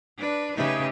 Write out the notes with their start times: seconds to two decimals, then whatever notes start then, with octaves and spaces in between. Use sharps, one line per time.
0.17 D4 B4
0.56 C#3 A3 D#4 G4 B4 E5